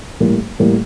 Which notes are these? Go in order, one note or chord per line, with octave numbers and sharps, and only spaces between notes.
A2 G3 A#3
A2 G3 A#3